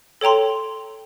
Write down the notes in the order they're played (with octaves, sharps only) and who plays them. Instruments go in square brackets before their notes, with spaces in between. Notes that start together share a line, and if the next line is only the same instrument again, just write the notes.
[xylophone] A4 C#5 G5 A#5 C6